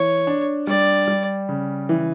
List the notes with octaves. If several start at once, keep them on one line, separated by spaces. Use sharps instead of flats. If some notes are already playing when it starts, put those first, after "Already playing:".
Already playing: E3 C#5
D4
G3 D5
G3
C#3
E3